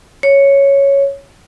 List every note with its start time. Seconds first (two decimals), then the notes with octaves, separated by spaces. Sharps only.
0.23 C#5